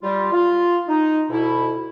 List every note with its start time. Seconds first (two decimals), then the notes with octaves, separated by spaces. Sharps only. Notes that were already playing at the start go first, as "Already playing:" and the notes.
0.02 G3 F4
0.33 F4
0.88 D#4
1.30 D2 B2 E4